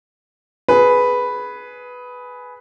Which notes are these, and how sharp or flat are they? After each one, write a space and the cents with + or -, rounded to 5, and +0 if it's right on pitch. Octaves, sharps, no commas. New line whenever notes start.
G#4 +15 B4 +0